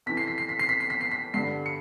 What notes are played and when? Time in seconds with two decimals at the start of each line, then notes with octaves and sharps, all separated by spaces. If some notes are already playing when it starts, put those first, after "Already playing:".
0.06 F2 C3 E3 B6
0.17 C7
0.28 B6
0.38 C7
0.49 B6
0.59 C7
0.69 B6
0.80 C7
0.90 B6
1.01 C7
1.11 B6
1.34 G2 D3 G3 C7
1.66 C#7